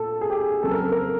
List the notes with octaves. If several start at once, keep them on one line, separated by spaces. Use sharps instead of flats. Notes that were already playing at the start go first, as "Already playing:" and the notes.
Already playing: A#2 A4
G#4
G4
G#4
F2 C#3 F#3 A#3 A4
A#4
A4
A#4